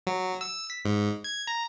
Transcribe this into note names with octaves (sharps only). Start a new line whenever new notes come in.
F#3
E6
B6
G#2
G#6
A#5